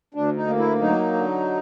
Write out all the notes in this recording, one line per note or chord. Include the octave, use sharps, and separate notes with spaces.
D2 D4
D#4
A#3
E4
F#3 D#4
D3